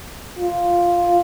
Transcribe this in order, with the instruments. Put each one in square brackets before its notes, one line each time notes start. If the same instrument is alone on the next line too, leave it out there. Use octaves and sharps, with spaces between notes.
[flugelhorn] F4